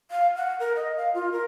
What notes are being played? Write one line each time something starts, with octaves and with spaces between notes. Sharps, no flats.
F5
F#5
A#4
D#5
F5
F4
A#4